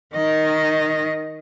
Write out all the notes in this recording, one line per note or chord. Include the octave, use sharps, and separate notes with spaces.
D#3 D#5